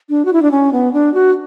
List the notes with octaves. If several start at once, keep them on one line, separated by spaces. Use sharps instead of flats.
D4
F#4
E4
D4
C#4
B3
D4
F#4